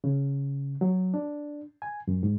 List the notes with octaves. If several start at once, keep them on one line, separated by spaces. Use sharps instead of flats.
C#3
F#3
D4
G#5
F#2
G#2